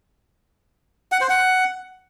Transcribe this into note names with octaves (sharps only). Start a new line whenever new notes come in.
F#5
C5
F#5